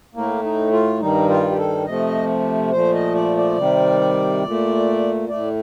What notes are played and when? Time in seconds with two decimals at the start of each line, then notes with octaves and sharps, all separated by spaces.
0.14 A2 A3 A#3
0.44 D#4
0.72 F4
1.00 G2 D#3 G3 D#4
1.29 F4
1.51 G4
1.58 A4
1.86 C3 F3 A3 D#5
2.72 A#2 F3 A3 C5
2.94 D#5
3.15 D5
3.37 D5
3.58 C3 D#3 G3
4.44 A#2 A3
5.29 A2 A3 D5